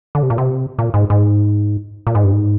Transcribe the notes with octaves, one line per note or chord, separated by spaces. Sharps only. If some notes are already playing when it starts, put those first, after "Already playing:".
D3
C3
A#2
C3
A#2
G#2
G#2
A#2
G#2
G2
G#2